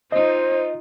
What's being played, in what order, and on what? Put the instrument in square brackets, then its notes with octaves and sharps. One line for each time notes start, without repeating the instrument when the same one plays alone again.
[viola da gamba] D#4 F4 [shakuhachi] C5 [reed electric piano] D#5